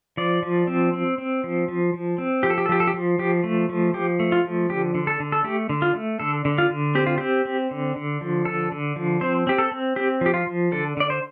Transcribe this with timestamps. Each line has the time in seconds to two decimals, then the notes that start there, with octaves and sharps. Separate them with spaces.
0.17 F3 D5
0.43 F3
0.67 C4
0.93 C4
1.18 C4
1.44 F3
1.68 F3
1.94 F3
2.18 C4
2.43 F3 G4
2.50 A4
2.58 G4
2.66 A4
2.69 F3 G4
2.80 A4
2.87 G4
2.94 F3
3.19 F3 G4
3.44 A3
3.69 F3
3.94 F3 G4
4.19 A3
4.32 F4
4.45 F3
4.70 D3 G4
4.95 D3
5.07 A4
5.20 D3
5.32 A4
5.44 A3 G4
5.69 D3
5.82 F4
5.95 A3
6.20 D3 A4
6.45 D3
6.58 F4
6.70 D3
6.95 C4 G4
7.06 F4
7.18 C4 G4
7.45 C4
7.71 D3
7.96 D3
8.21 F3
8.45 D3 A4
8.72 D3
8.96 F3
9.21 C4 C5
9.47 C4 G4
9.58 A4
9.72 C4
9.96 C4 G4
10.21 F3 G4
10.34 F4
10.47 F3
10.72 D3 A4
10.97 D3 D5
11.10 C5